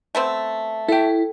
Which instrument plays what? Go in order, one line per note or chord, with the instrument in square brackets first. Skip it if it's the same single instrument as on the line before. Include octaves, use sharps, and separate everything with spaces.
[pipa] A3 B3 C4
[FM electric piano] E4 [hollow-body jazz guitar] A4 G5